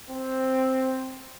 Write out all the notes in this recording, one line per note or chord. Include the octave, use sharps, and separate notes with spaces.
C4